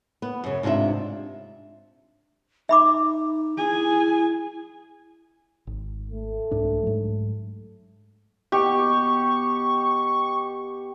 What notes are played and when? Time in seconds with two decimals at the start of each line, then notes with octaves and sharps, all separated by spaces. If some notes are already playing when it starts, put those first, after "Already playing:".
0.22 B3
0.44 F#2 C#3
0.63 G#2 C3 D4 F4 E5
2.69 D#4 E5 B5 D6
3.57 E4 G#4 G#5
5.67 G#1
6.10 A3
6.51 C2 G#2 D4
6.83 G#2 F#3
8.52 B2 G4 C#6